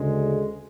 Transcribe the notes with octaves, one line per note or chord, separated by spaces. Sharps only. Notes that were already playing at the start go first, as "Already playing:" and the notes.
Already playing: D2 C#3 G#3